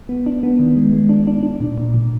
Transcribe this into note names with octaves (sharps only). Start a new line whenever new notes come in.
B3
D4
B3
D#3
G#3
G#3
D4
D4
D4
A#2
A#2
A#2